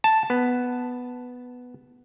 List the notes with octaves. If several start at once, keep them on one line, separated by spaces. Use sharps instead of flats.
A5
B3